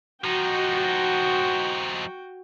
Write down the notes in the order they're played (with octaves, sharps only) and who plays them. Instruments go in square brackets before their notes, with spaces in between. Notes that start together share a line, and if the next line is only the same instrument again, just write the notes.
[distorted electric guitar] F3 D#4 [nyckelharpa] F#4 G5